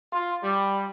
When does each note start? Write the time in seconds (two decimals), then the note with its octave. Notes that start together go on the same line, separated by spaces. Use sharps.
0.13 F4
0.43 G3